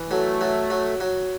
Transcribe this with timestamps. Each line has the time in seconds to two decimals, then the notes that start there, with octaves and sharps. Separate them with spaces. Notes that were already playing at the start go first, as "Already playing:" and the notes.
Already playing: E3
0.10 F#3 A3
0.41 F#3
0.70 F#3
1.00 F#3